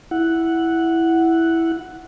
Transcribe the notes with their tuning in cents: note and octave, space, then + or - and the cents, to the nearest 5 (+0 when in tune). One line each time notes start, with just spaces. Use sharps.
E4 +0 F#5 +0